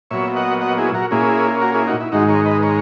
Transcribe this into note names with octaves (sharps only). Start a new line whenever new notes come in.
A#2 F#3 B3 C#5 E5
D#5 F#5
D#5 F#5
E4 G#4
F#4 A#4
A#2 A#3 C#4 E4 G#4
F#4 A#4
E4 G#4
D#4 F#4
E4
G#2 D#3 G#3 D#4 F#4
A#4 C#5
B4 D#5
A#4 C#5